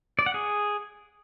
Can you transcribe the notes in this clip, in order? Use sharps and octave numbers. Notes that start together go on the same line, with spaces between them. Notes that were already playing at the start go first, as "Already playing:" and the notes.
D5
F#5
G#4